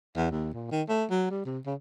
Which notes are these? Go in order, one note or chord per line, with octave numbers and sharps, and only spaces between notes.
E2
D#2
A#2
D#3
A3
F#3
G3
C3
C#3